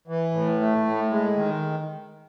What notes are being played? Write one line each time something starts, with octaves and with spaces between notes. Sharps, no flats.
E3
A2
A3
A2
G#3
D#3